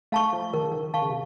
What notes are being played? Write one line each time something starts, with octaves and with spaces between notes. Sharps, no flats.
A3 F5 A5 C#6
F3
D#3 A#4
C#3
D#3
D#3 F5 A5 C#6
C#3
C3